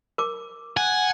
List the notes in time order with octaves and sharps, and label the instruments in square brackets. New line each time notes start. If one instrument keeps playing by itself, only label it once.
[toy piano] A#4 D6
[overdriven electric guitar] F#5 [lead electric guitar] G#5